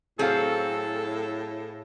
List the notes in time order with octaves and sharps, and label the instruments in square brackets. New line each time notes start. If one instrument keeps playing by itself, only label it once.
[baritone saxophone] A2 [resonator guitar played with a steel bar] F#3 C4 [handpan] G#4 F5 [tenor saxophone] A4